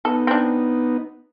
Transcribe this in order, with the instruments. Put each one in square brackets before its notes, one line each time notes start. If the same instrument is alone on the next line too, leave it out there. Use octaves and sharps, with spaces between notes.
[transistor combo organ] B3 D#4 [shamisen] A4
[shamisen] C4 D4